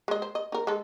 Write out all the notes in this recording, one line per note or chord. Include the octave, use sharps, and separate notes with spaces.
G#3 D#5
C5
D#5
D#4 A#4
G#3 A4